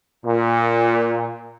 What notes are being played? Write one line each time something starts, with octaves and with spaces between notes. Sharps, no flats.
A#2